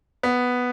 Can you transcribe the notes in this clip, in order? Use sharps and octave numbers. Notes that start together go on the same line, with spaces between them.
B3